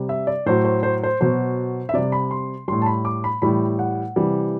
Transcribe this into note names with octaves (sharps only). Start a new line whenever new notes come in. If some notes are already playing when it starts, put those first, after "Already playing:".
Already playing: C3 G3
E5
D5
A2 F#3 C5
C5
C5
C5
B2 F#3 C5
E5
C3 G3 D5
B5
C6
A2 G3 C6
A5
B5
D6
B5
A2 E3 G3 B5
F#5
C3 E3 G3